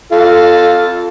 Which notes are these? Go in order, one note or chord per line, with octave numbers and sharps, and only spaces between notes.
F4 A4